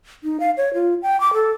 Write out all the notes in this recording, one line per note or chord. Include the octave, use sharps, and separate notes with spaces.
D#4
F5
C#5
F4
G5
D6
A4